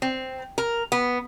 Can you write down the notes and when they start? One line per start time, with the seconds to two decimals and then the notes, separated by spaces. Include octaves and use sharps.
0.02 C4
0.58 A#4
0.92 B3